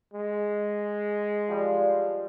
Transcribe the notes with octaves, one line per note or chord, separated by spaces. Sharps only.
G#3
F3 G3 C6